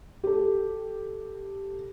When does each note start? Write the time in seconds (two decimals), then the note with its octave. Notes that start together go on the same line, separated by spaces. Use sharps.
0.24 G4 A4